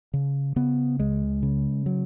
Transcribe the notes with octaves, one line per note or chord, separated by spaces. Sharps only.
C#3
C#3 B3
C#2 G#3
C#3
F#3